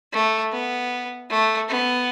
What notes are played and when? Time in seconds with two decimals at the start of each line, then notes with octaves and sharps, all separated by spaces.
0.13 A3
0.52 B3
1.30 A3
1.69 B3